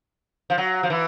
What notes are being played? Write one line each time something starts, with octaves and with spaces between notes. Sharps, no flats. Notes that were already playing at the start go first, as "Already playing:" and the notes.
F3
F#3
F3
E3